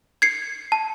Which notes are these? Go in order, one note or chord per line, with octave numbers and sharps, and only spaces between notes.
G#6 C7 C#7
A5